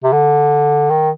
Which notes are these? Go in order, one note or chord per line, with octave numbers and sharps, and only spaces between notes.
C3
D3
D#3